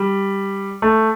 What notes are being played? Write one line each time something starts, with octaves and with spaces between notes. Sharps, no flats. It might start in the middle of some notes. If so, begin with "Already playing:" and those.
Already playing: G3
A3